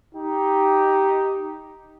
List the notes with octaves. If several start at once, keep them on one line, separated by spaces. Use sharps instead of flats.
D#4 G4